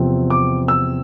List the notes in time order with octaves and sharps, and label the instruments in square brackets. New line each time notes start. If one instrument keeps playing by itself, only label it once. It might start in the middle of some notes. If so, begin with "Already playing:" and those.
Already playing: [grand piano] E2 C3 F3 C4
D6
E6